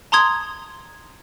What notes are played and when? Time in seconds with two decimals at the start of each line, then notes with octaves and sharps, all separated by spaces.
0.12 A5 A#5 C6 D#6 G#6